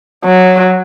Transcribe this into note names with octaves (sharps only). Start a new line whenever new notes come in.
F#3